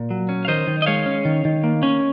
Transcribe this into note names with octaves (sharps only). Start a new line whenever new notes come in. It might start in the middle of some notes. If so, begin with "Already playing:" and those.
Already playing: A#2
F#3
C#4
F5
D#3 C5 D#5
D#3
D#5
G#3 C#5 F5
C#4
D#3
D#3
A#3
C#4